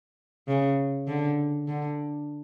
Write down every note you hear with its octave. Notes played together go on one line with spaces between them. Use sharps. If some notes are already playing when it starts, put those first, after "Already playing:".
C#3
D3
D3